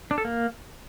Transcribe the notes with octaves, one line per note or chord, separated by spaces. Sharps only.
D4
A4
A#3